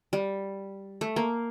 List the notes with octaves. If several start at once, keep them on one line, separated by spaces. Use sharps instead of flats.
G3
A3
A#3